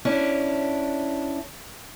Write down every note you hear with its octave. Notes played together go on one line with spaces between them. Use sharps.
C#4 D4 E4